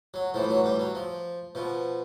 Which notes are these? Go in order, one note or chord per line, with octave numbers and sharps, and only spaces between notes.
F#3
A2 E3 F3
F#3
G3
F#3
F3
B2 F3